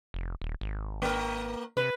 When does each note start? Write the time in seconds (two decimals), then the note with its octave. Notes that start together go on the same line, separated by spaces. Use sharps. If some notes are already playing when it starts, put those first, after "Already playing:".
0.14 F1
0.42 D#1
0.61 G#1
1.02 A#3 A#4
1.77 C3 B4